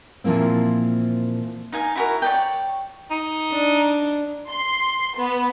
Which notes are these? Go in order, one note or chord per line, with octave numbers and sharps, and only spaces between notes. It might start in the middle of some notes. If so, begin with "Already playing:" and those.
A#2 E3 F3 A#3 C4
D#4 F5 G#5
E4 F#4 A#4
C#5 D5 G5
D#4
D4
C6
B3